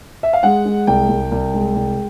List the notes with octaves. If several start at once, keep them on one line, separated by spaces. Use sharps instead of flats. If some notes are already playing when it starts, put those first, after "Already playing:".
E5
F5
G#3 F#5
G#3
C2 G5
C2
C2
G#3
C2